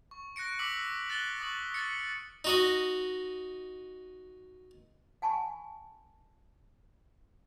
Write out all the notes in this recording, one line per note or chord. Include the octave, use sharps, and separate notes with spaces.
C#6
F#6 A#6 C#7 D7
D6 E6 B6 F#7
F#6 A6 B6 F#7 G7
C#6 D#6 A6 F#7
F6 A6 B6 C#7
D#4 F#4 D#5
F#5 G#5 A5 B5 C#6